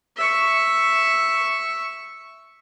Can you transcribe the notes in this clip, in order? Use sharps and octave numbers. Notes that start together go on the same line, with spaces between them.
E5 C#6